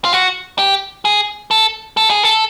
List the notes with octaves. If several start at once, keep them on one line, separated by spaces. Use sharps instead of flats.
F4
F#4
G4
G#4
A4
A4
G#4
A4